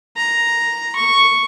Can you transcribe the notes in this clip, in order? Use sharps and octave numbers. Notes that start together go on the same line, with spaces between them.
A#5
C#6